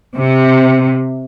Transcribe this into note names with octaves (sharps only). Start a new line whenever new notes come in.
C3